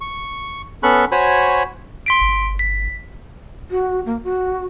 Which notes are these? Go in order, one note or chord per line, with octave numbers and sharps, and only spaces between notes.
C#6
B3 C#4 A4 B5 C#6 F#6
F#4 C5 C#5 G#5 B5
C6 B6 D7
G1
B6
F#4
A#3
F#4